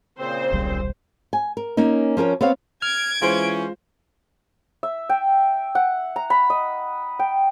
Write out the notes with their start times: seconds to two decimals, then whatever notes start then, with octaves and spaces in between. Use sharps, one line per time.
0.18 A#2 C#3 C4 C5
0.52 D#1 B1 G3
1.33 G#5
1.57 A#4
1.77 A#3 C#4 D#4
2.17 F3 C#4 A#4 C#5
2.41 B3 C4 C#5 F5
2.82 F6 G#6 D7
3.22 E3 G#3 C#4 F4 C5
4.83 E5
5.09 G5
5.75 F#5
6.16 A#5
6.30 B5
6.50 D#5
7.19 G5